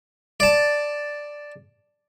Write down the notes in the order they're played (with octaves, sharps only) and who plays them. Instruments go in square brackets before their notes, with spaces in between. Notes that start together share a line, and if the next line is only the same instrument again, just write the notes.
[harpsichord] D5 A5